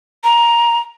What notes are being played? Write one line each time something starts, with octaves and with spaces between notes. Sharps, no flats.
A#5